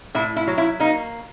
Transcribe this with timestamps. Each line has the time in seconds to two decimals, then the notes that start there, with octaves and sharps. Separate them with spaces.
0.14 A2 E4
0.36 E4
0.47 F#3
0.58 E4
0.80 A#3 D#4